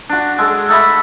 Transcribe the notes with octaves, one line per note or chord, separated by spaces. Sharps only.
D4 F#4
G#3 A4 D5
A3 A4 D#5 B5